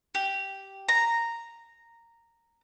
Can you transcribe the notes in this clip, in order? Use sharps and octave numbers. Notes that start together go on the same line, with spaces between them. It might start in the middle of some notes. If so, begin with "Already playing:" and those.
G4
A#5